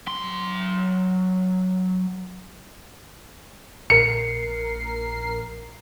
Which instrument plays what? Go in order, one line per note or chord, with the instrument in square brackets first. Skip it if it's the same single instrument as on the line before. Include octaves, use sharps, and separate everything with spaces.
[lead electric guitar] F#3 C6
[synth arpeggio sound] A#1 A#4 C7 [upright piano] C#7